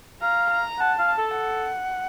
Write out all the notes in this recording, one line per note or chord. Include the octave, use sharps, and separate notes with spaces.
F5 A#5
A#5
F#5 A5
F5
A5
A4
F#5